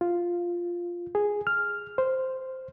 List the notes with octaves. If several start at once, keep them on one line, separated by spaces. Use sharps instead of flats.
F4
G#4
F6
C5